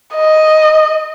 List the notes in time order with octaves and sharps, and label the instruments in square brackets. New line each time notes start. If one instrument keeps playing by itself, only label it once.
[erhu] D#5